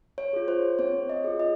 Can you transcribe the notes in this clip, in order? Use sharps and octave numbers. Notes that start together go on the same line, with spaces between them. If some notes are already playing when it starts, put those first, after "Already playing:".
C#5
F4 G#4
C5
C4 C#5
D#5
F4 G#4
D#5